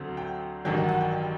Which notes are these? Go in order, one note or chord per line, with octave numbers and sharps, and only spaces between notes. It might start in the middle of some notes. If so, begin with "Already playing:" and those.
Already playing: D2 D3 F#3 C4
G5
A1 G2 D#3 F#3 G5
F#5
F#5
G5